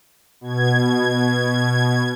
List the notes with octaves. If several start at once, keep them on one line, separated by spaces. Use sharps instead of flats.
B2 G#6